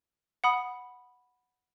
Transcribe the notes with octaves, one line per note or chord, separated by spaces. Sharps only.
F#5 B5 D#6